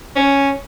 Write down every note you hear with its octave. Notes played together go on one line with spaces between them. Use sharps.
C#4